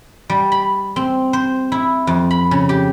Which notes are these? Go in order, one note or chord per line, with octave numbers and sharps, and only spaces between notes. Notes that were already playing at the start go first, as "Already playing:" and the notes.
G3
B5
C4
C5
E4
F2
B5
C#3
G4